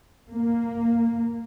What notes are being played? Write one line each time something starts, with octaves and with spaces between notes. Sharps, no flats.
A#3